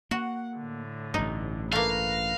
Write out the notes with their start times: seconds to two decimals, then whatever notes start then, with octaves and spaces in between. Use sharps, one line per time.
0.11 A#3 F#4 F#5
0.58 A2 D3
1.14 A1 G2 D#4
1.72 A3 A#3 B4 F5 A#6